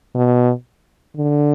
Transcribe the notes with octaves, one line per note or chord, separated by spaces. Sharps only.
B2
D3